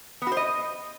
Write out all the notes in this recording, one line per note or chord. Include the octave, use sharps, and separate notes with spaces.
B3
F#4
C5
D#5